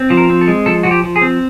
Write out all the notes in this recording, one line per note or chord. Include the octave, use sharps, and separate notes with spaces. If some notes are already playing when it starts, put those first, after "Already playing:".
Already playing: C4
F3
A#4
C4
A4
G#3
F3 A4
F3 F#4
G4
F3
G#4
C4